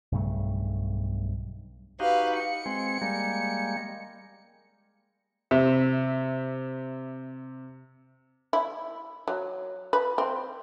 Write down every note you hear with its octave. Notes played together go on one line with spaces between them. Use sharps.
B1 G2 C#3 A3
D#4 F#4 G4 B4 F5
C#7
G#3 C4
G3 G#3 A#3
C3 E5
E4
F#3
B4
C4